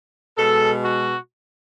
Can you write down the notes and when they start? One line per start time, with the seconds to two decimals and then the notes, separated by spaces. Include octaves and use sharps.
0.38 B2 G#3 A4
0.84 F#4